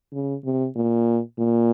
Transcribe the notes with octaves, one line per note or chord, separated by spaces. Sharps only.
C#3
C3
A#2
A#2